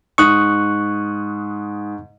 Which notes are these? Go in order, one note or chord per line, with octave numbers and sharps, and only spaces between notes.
G#2 C#6 D#6 F#6